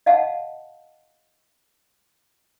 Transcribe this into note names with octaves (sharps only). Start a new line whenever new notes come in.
D#5 F5 F#5 A5